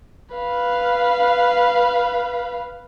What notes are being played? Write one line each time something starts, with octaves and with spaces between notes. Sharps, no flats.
B4 F5